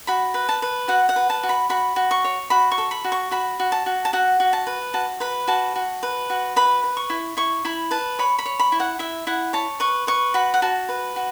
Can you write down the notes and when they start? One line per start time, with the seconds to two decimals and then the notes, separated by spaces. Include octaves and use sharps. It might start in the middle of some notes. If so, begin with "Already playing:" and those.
0.07 F#4 B5
0.34 B4
0.49 A5
0.62 B4
0.88 F#4 F#5
1.09 F#5
1.16 B4
1.30 A5
1.43 F#4
1.49 B5
1.70 F#4 B5
1.96 F#4
2.11 C#6
2.24 C#5
2.50 F#4 B5
2.72 C#6
2.78 A4
2.91 B5
3.04 F#4
3.12 C#6
3.31 F#4 B5
3.60 F#4
3.72 A5
3.86 F#4
4.05 A5
4.13 F#4 F#5
4.40 F#4
4.53 A5
4.67 B4
4.94 F#4 A5
5.20 B4 B5
5.48 F#4 A5
5.76 F#4
6.03 B4
6.30 F#4
6.56 B4 B5
6.84 B4
6.97 C#6
7.10 E4
7.37 E4 C#6
7.65 E4 B5
7.91 B4 A5
8.19 C#5 B5
8.39 B5
8.46 C#5
8.59 B5
8.72 E4
8.80 F#5
8.99 E4 E5
9.27 E4 F#5
9.53 C#5 A5
9.80 B4 C#6
10.07 B4 C#6
10.34 F#4 B5
10.54 F#5
10.62 F#4 A5
10.89 B4
11.16 F#4